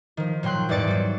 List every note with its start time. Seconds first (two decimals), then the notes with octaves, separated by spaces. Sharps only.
0.17 D#3 F3
0.43 A#2 F#3 G5 C6 F#6
0.69 E2 G#2 G3 D5 A6 C#7
0.88 F#3 G3